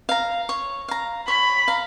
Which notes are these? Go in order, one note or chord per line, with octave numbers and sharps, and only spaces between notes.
F5 A#5
C#5
F5 A#5
C#5 B5
F5 A#5